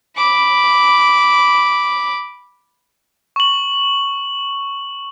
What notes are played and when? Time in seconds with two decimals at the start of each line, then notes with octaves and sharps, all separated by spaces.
0.17 B5 D6
3.36 C#6 F#7